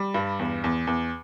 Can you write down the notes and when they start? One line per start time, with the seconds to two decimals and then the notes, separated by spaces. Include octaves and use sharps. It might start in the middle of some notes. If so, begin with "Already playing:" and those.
Already playing: G3
0.14 G2
0.39 E2
0.64 E2
0.87 E2